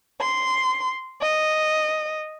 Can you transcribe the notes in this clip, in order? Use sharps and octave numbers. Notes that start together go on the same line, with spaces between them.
C6
D#5